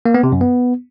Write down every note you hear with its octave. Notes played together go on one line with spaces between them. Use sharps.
A#3
B3
C3
F#2
B3